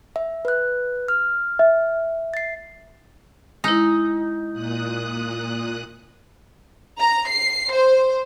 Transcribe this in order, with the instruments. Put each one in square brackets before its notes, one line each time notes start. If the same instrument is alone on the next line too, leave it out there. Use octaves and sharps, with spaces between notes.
[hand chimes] E5
B4 F#6
F6
[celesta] E5
[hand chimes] A6 C7
[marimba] G#3 E4 [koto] D#4
[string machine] A#2 D#6 F#6
[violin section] A#5
C7
C5